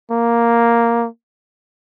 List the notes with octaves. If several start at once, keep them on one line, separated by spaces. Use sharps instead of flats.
A#3